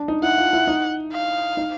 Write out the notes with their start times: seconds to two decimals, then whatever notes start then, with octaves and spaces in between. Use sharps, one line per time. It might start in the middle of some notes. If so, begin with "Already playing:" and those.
Already playing: D4
0.08 D#4
0.22 E4 F#5
0.38 F4
0.53 E4
0.67 D#4
1.13 F5
1.57 D#4